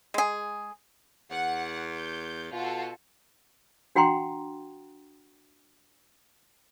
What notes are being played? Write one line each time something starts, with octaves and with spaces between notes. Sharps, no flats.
G#3 G#4
E2 F#5
G6
B2 F4 F#4 A4
D4 F#4 F#5 G5 A#5 C6